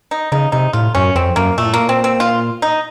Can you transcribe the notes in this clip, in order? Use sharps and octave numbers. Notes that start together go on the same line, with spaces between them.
D#4
C#3 D#4
C3 D#4
A2 F4
F#2 C#4
F2 C4
F#2 A#3
A#2 A3
A2
A#2 A#3
C4
C4
F4
D#4